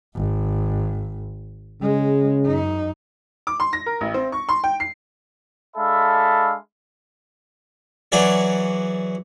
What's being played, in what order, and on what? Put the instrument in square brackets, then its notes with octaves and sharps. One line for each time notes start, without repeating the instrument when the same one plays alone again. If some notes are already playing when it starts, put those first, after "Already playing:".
[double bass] G#1
[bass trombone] C#3 [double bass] G#3
[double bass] F#2 D#4
[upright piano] D6
C6
A#6
A#4
A1
C4
C#6
C6
G5
C7
[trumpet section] G#3 D4 A4 E5 F5 B5
[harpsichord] E3 F#3 G#4 C#5 D5